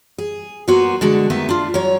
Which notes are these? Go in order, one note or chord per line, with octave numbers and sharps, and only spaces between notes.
G#4
F#3 A#3 B3 F#4 C5
D3 G#3 F#4 A5
D#2 D#3 A3 B3 E5
D4 F4
F#3 C#5